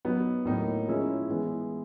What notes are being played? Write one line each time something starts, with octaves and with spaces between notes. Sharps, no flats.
F#3 B3 D#4
A2 F#3 A#3 D#4
F3 G#3 C#4 E4 G#4
E3 G#3 B3 E4 G#4